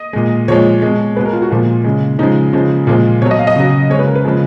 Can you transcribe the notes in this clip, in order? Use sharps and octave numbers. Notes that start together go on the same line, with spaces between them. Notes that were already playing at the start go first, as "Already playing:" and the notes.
Already playing: D#5
A#2 G#3
A#2 F3 G#3 C#5
B2 G#3
B2 G#3 B4
A#4
F4
F#4
A#2 F3 G#3 F4
C#3 G#3
C#3 F3 G#3 D#4
C#3 F3 G#3
A#2 F3 G#3 F4
B2 F#3 C#5
D#5
F5
D#5
C#3 F#3
C#3 G#3 C#5
B4
A#4
B4
C#3 F3 G#3